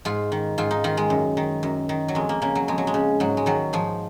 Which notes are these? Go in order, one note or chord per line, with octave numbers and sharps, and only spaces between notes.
G#2 F4
D#3
G#2 F4
D#4
D#3 F4
G#3
F#2
D#3
F#2
D#3
F#3
F2 G#3
A#3
C#3 A#3
F#3
F2 G#3
F#3
G#3
C#3
G#2 F#3
G#3
D#3 F#3
G#2 F3